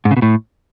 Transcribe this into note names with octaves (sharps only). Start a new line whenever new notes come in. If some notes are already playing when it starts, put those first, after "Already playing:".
G#2
C#3
B2
A2